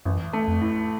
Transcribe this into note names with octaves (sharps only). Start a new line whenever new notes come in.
A1 F#2
A3
F2
A2